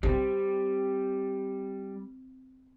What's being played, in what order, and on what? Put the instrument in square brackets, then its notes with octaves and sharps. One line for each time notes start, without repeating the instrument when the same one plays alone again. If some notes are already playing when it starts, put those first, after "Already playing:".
[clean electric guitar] G3 [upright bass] C4